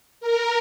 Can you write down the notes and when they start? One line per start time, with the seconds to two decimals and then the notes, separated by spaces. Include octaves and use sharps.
0.21 A#4